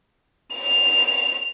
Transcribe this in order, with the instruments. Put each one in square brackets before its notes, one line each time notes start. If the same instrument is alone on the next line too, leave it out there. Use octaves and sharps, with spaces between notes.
[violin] F7